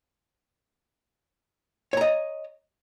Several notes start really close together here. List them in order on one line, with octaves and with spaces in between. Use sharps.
C#5 A#5 D#5